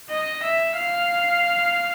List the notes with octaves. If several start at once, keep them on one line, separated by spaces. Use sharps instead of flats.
D#5
E5
F5